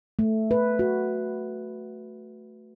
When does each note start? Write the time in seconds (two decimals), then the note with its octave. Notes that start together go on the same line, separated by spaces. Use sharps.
0.19 A3
0.51 B4
0.79 F#4